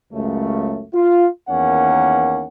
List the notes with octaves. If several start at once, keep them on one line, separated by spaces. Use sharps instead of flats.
C#2 F#2 C#3 A3
F4
E2 D#3 A#3 C#4 F#5